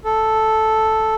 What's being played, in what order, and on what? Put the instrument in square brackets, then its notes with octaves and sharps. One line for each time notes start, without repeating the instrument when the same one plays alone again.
[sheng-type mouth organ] A4